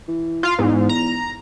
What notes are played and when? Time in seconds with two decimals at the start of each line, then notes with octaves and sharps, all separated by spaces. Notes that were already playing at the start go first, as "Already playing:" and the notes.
0.08 E3
0.43 F4 F5
0.59 E2 G#2
0.89 A#5